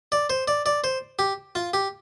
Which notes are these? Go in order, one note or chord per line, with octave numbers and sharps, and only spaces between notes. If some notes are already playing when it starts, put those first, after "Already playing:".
D5
C5
D5
D5
C5
G4
F4
G4